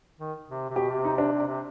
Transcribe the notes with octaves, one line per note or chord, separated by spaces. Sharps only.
D#3
C3
C3
B2 G4
C3
D#4
D4
C3
C3